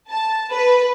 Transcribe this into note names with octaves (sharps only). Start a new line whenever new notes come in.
A5
B4